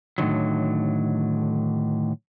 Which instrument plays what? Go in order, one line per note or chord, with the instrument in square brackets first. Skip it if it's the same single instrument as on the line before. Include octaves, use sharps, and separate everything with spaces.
[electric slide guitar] A2 D3 D#3 F#3